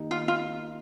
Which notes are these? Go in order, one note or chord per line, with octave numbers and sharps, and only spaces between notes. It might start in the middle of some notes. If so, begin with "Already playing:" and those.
Already playing: D#3 A#3 D#4 G4
F4
F4